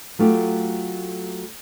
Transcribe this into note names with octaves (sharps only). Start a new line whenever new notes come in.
F#3 A3 F4 G4